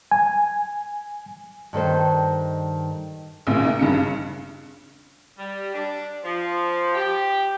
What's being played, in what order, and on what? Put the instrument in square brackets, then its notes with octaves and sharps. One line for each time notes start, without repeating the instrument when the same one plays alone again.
[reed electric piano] G#5
[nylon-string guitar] G2 D#3 A4 C5
[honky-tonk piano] A1 A#2 C#3
D#4
G2 C#3 C#7
[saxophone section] G3
D4
F3
G4